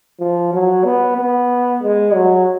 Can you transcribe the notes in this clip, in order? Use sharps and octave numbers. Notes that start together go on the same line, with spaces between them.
F3
F#3
B3
B3
G#3
F#3